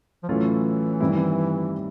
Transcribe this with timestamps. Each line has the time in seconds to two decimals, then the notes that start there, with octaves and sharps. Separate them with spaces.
0.23 F3
0.29 A2 E3 F#3 A3 C#4 F4
1.00 G2 D#3 G3 C4 E4